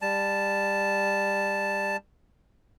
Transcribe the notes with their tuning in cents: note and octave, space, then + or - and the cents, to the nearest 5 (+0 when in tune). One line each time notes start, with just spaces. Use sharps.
G3 +20 A5 +0